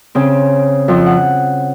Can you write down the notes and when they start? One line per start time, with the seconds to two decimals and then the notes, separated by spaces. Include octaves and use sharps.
0.15 C#3 C4
0.88 F2 F3
1.06 F#5